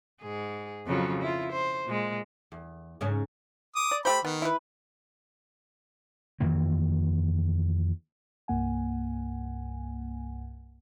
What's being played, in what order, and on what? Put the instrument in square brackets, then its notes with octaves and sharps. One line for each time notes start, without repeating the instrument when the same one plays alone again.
[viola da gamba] G#2 G#4
F2 C#3 F#3
E4 F4
C5
A#2 G#3
[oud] E2
G#2 C#3 C#4
[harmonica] D6 D#6
[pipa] D5
[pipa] A3 G4 C5 [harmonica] B5
[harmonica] D#3 [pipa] B3
[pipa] E4 B4
[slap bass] F2 D#3 E3 A#3
[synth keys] C2 G2 A#3 F#5 G#5